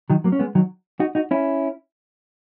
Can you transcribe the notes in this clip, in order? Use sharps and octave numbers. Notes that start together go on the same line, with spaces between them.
D#3 F#3
F#3 A#3
C#4
G#3 B3
D#3 F#3
D#4 F#4
D#4 F#4
C#4 E4